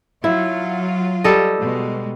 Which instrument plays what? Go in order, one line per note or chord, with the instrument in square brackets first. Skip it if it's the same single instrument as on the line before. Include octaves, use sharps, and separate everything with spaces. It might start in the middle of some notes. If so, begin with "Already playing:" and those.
[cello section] F#3 F4 [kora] E4
[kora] G3 A4 D#5
[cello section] B2 G#3